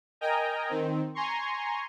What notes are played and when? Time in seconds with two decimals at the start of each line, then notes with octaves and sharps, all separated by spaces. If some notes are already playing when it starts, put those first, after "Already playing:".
0.21 A#4 D#5 G5 G#5 A#5
0.69 D#3 C4
1.15 G#5 A#5 C6 C#6